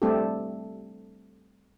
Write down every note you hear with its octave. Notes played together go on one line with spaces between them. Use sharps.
G3 A3 C4 D4 G4 A4